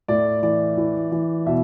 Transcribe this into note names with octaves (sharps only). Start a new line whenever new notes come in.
A2 D5
E3 D5
E3
E3
B2 E5